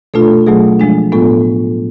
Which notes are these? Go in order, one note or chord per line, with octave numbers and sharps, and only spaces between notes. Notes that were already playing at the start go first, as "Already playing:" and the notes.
B2 A3 D4 F4 A4
B2 F#3 A3 G#4
F3 G#3 D4
A2 G#3 B3 F4 A4